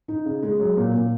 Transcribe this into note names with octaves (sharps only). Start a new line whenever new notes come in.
D#4
C#3
G#3
F#3
A#2
A#2